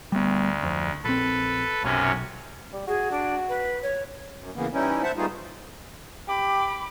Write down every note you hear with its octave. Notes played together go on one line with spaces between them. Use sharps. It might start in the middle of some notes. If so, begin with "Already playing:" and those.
D2 G3 B3
F2
A#1 C4 A4 B4
B1 F#2 C3 C#4
G3
F#4 G#4
D4
B4
C#5
F#2
C#3 E3 A#3 B3
E3 G3 C#4 D#4 E4
C5 E5 F#5 A5
G3 A3 B3 D#4 F4 G#4
G4 B5 D6